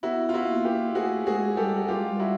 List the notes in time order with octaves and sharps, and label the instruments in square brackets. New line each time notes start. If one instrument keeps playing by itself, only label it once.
[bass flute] B3 [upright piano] E4 F#4
[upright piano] F4
E4 F#4
[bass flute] A#3
[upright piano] F4 G4
[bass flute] A3 [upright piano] F#4 G#4
[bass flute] G#3 [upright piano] F#4 G#4
[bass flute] G3 [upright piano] G4 A4
[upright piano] F#4
[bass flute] G3 [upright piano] F4 G4
[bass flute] G#3
G3
[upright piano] E4 F#4